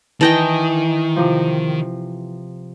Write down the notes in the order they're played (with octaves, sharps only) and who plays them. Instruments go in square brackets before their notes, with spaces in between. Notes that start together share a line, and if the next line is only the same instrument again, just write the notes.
[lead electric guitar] D#3 [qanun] E3 D#5 G5 [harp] A5 G6
[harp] C3 F3